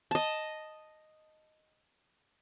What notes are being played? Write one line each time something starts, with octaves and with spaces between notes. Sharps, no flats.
D#5 A5